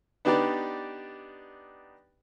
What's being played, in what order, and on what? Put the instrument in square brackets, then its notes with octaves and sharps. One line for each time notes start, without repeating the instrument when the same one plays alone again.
[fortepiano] B3 D4 D#4 G4 B4 D5